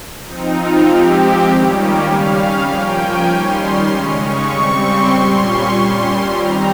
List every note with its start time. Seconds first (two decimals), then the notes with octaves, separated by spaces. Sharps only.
0.25 F3 C4 D#4
0.56 F4
0.86 F3 G#3 C4 G4
1.47 D#3 G3 A#3 C#4
1.78 G4
2.07 C#3 G3 C#4 F5
2.68 F3 A#3 C#4 G5
2.98 G#5
3.29 D#3 G3 C#4 C6
3.90 C#3 G#3 C#4
4.21 C#6
4.51 C#3 G3 C4
4.81 C6
5.11 A#2 G3 C#4 C6
5.43 C#6
5.72 A#2 G3 C#4 C6
6.33 D#3 G3 C4 A#5